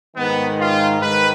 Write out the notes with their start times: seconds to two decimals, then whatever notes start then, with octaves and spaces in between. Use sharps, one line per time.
0.17 G#2 D#3 B3
0.59 F4
1.01 G#2 D#3 B4